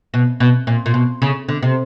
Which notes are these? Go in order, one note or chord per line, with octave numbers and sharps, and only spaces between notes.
B2
B2
A#2
A#2
B2
C#3
D3
C3